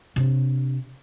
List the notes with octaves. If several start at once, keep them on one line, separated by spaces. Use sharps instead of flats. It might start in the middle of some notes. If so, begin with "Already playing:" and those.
C3 D4